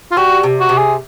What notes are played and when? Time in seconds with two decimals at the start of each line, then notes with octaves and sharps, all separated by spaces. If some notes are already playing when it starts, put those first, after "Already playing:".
0.11 F4
0.17 G3 F#4
0.43 C3
0.60 F#4
0.69 C3
0.78 G#4